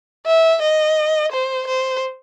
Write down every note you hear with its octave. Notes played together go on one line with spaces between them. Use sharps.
E5
D#5
C5
C5